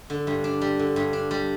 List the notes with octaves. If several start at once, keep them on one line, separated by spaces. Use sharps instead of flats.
D3
G2
D4
G3
D3
G2
D4
G3